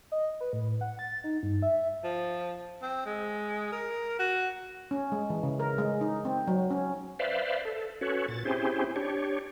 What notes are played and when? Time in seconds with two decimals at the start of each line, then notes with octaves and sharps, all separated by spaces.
0.12 D#5
0.41 B4
0.53 A2
0.81 F#5
0.99 A6
1.24 D#4
1.43 G2
1.62 E5
2.04 F3
2.82 C4
3.06 G#3
3.72 A#4
4.19 F#4
4.91 C#4
5.12 G#3
5.30 E3
5.43 C#3
5.60 A#4
5.78 G#3
6.01 D#4
6.25 C4
6.47 F#3
6.71 C#4
7.19 B4 C5 D5 E5 F5
7.65 A4
8.01 C#4 F#4 A4 B4 C#5
8.28 A#2 A6
8.45 C4 C#4 E4 G4 G#4 C5
8.96 D4 G4 C#5